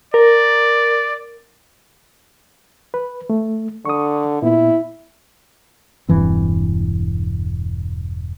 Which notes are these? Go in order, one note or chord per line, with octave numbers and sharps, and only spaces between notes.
A#4 D5
B4
A3
D3 C#6 D#6
A#2 B3 E4
E1 G2 E3 C4